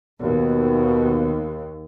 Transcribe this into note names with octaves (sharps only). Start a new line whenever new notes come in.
D#2 B2